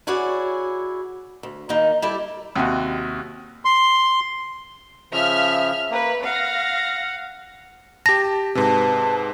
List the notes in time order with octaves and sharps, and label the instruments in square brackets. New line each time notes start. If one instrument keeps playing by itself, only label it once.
[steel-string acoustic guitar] C#4 E4 F#4 G#4 C#5 D5
D2
D#3 A#3 D#4
G3 E4 G4 A4
[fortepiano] D#2 C3 F#4
[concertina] C6
[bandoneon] C#3 F3 [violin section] E5 F6
[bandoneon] A#3 [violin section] B4
[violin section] F5 A#6 [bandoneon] F#5
[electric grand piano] G4 A5 [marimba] A#6
[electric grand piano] G#2 C3 [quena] B4 [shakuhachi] A5